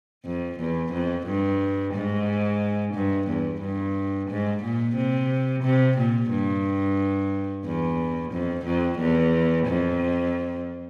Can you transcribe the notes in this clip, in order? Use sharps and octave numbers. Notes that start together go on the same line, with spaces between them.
F2
E2
F2
G2
G#2
G2
E2
G2
G#2
A#2
C3
C3
A#2
G2
E2
F2
F2
E2
F2